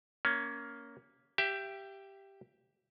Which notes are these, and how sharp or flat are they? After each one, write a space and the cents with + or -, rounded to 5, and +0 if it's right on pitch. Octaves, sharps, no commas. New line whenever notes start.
A#3 +0 C#4 +20
G4 +0 E5 +30